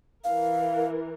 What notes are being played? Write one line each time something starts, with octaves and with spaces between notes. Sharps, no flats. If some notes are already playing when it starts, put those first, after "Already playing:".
E3 A#4 F5